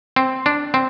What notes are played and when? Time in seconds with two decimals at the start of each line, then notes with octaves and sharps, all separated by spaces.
0.16 C4
0.46 D4
0.74 C4